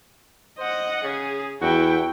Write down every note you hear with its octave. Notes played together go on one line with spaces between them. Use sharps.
C5 D#5 F#5
C#3 G#4
E2 E4 F#4 G5